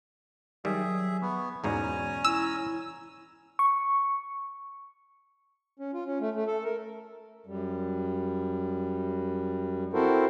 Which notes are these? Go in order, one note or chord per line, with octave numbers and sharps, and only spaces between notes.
D#3 F#3 G3 G#4 E5
B3 C#6
E2 G#2 B2 C#4 D5 G#5 A#5
E4 E6
C#6
C#4
F4
C#4
A3
A3
A4
A#4
F#2 G3
C4 E4 F#4 A4 A#4 C5